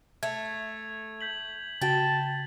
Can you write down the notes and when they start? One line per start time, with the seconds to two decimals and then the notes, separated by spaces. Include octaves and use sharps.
0.23 A3 G#6 F7
1.21 G6 B6 F#7
1.82 C#3 F#4 G5 A5 G6 A6